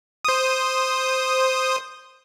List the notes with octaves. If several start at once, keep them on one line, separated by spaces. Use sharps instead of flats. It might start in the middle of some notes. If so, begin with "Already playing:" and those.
C5 D#6